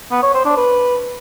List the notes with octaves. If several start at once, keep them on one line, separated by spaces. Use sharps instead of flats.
B3
C#5
C5
D4
B4